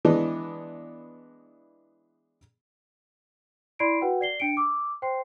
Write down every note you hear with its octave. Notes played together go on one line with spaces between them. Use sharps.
E3 G#3 B3 D4 E4 D#5
E4 D5 B5 C6 C7 D7
F#4 B4 F#5 G5
D5 C7 G7
D4 G5 C#7 D7
D6 E6
C5 G5 C6 C7